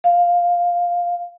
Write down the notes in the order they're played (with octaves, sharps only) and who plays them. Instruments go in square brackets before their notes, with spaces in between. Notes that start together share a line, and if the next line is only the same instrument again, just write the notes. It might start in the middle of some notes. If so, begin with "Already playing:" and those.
[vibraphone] F5